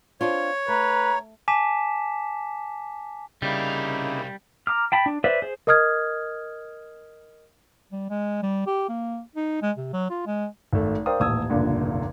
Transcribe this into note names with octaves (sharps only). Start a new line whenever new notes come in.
C4 D4 F4 C#5
A3 B4 A#5
G#5 A5 D6 B6 E7
C2 C#3 G3 A#3 D#4 E4 F5
A#5 D6 F6
G5 A5 B5
D4
B4 C5 D5 E5
G#4 C5
A#4 D#5 D#6 F6 G#6
G3
G#3
G3
G4
A#3
D#4
G#3
C3
F#3
F4
G#3
G#1 A3
A#4 C5 D5 F5 G5 D#6
D#1 A1 D#6 E6 G#6
F1 C#2 G2 A#2 D3